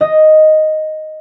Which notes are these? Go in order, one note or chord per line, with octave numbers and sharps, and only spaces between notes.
D#5